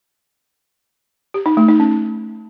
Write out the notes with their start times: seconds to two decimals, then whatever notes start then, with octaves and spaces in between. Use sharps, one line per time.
1.34 G4
1.46 D#4
1.57 A3
1.68 D#4
1.80 C#4